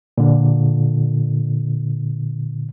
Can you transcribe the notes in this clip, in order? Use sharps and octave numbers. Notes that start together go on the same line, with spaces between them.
A#2 D3